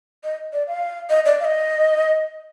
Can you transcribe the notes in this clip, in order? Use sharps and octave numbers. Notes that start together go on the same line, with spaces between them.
D#5
D5
F5
D#5
D5
F5
D#5